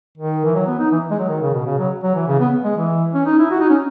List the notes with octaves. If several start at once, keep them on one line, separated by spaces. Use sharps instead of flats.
D#3
E3
F#3
B3
D#4
E3
G#3
F#3
D#3
C#3
B2
C#3
F#3
F#3
E3
C#3
B3
G#3
E3
C#4
D#4
E4
F#4
D#4
C#4